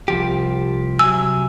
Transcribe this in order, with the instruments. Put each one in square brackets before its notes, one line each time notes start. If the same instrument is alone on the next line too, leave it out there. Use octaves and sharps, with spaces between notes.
[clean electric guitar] C2 F3 G4
[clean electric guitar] C3 F#3 G#5 [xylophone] E6